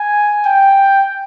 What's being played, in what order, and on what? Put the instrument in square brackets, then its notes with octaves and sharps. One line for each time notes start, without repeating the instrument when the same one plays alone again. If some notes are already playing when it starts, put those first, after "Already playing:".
Already playing: [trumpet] G#5
G5